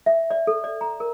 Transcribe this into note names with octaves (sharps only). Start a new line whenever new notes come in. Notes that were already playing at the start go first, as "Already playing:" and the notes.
E5
D5
A4
D5
A#5
A#4